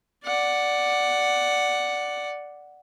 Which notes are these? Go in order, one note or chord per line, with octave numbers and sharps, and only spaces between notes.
D5 F#5